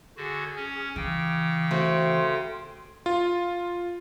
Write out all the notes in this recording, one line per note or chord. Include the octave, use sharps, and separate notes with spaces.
D3 F#4 G#4
C#4
C#3 E3 G5 D6
A3 C4 F#4 C6
F4